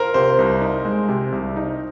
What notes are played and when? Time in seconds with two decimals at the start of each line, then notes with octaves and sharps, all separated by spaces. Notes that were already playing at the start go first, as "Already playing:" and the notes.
Already playing: A#4 C5
0.14 C3 C5
0.39 C2
0.62 D#4
0.85 G#3
1.09 C3
1.32 C2
1.56 D#4